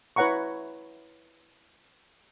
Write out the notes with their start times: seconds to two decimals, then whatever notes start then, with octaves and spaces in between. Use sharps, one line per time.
0.16 E4 B4 C#5 F#5 A#5 C#6